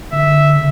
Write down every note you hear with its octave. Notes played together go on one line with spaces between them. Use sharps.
D3 E5
C#3